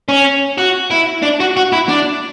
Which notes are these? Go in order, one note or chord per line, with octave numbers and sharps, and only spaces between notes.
C#4
F#4
E4
D4
F#4
F#4
E4
D4